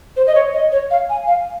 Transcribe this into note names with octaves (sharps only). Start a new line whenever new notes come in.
C5
D#5
C#5
D#5
C#5
F5
G#5
F5